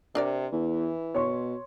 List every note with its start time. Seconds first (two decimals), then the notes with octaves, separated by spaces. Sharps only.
0.15 C3 D4 A#4 D5
0.52 E2 E3
1.15 B2 C#5 C6 C#6